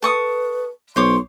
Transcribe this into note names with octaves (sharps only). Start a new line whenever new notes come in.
A4 B4 C#6 D#6
B1 C5 C#5 C6 D6